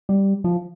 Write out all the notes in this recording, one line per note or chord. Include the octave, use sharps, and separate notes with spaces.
G3
F3